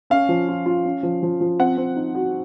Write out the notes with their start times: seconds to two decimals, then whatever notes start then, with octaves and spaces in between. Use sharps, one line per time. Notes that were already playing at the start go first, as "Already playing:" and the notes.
0.10 C#4 F5
0.29 F3
0.49 F4
0.66 F4
0.85 C#4
1.03 F3
1.23 F3
1.41 F3
1.59 C4 F#5
1.77 C4
1.96 D#4
2.15 F#4